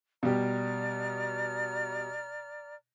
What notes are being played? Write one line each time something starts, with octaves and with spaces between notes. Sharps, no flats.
B2 G3 G4 D5 A#5 F6